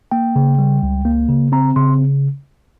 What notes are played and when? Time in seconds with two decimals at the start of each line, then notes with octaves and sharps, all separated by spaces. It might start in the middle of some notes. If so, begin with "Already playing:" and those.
0.11 A#3 G5
0.36 C#3
0.59 G3
0.83 C#2
1.05 A#3
1.29 C#3
1.52 C4 A#5
1.76 C#3 C6